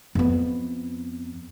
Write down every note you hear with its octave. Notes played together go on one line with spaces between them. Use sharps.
F2 B3